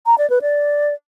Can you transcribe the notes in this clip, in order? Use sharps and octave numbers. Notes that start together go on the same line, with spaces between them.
A#5
D5
B4
D5